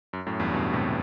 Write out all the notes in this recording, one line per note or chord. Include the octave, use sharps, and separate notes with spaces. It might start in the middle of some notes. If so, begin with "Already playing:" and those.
F#2
F#2 A2
E2 G2
G2 B2
A2 C3